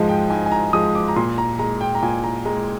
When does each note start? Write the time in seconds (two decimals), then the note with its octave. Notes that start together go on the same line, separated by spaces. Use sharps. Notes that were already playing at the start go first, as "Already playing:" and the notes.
Already playing: G#2 F3 G#3 D#5
0.09 G5
0.30 G#2 G#5
0.46 G#5
0.51 A#5
0.73 F3 G#3 D#6
0.95 D6
1.08 A#5
1.16 A#2 C6
1.38 A#5
1.59 G#3 A#5
1.81 G5
1.95 A#5
2.02 A#2 G#5
2.23 A#5
2.45 G#3 A#5